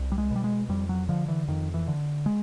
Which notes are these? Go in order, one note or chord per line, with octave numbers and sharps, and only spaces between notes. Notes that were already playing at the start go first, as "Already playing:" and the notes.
Already playing: C2
G3
G#3
B2 G3
G#3
F2 G3
F#3
D3 F3
E3
F2 D#3
E3
D3
G#3